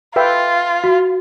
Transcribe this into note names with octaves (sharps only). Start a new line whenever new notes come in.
F4 B4 E5 G5
F#4